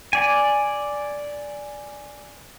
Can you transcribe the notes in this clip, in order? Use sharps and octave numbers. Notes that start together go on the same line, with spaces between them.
D5 G#5